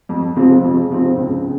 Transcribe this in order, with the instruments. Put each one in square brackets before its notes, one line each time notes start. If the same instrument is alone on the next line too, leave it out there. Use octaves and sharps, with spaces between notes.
[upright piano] F2
C3 F3 G#3 C4
F2
C3 F3 G#3 C4
C#2
C#3